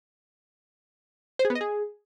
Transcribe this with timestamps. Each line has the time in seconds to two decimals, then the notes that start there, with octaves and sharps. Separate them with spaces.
1.39 C5
1.45 G#4
1.50 B3
1.55 D#5
1.61 G#4